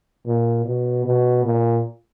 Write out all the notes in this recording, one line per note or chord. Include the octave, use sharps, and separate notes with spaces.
A#2
B2
B2
A#2